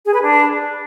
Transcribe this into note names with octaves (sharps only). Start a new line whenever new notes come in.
G#4
B4
D4